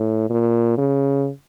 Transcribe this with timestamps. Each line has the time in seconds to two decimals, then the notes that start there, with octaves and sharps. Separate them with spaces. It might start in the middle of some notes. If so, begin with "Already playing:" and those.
Already playing: A2
0.30 A#2
0.78 C#3